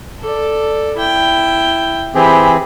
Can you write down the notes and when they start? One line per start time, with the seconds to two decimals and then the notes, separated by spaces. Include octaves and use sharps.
0.21 A4 D5
0.97 E4 G5
2.15 E3 C4 G4 G#4 B5